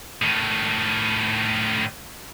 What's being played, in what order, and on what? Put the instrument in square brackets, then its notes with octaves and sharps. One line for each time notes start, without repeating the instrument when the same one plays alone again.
[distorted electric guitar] A2 D#3